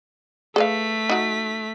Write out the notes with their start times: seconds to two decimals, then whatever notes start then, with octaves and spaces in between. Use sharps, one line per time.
0.56 A3 G#4 B4 F5 B6
1.09 D#4 F#4